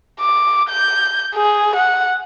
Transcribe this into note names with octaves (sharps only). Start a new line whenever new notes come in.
D6
G6
G#4
F#5